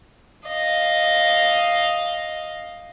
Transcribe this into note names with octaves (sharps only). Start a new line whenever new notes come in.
D#5 F5